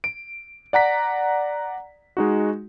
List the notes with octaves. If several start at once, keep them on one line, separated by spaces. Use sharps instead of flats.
D7
D5 F#5 A#5 B6
G#3 D#4 F#4